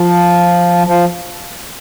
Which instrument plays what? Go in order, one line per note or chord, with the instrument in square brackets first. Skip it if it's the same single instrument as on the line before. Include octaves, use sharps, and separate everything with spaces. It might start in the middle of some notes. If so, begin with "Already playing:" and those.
Already playing: [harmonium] F3
F3